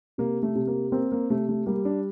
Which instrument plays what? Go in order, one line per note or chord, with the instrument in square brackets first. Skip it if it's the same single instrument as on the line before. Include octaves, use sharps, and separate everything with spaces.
[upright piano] C3 [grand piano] A#3
[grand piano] A3
[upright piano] C3
[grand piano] A#3
[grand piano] A#3 [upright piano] C4
[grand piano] A#3
[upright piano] C3 [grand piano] A3
[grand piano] A3
[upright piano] G3 [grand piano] A#3
[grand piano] D4